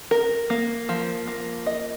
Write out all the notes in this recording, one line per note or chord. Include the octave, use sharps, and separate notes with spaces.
A#4
A#3
F3
A#3
D#5